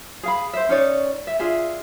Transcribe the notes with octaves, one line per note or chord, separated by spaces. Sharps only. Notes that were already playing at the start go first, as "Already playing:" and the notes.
G#4 F5 B5
C5 E5
C#4 D#4 C#5 D5
E5
D4 F4 G#4 E5